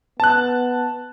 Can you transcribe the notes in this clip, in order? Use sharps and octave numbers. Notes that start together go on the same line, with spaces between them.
B3 A5 F#6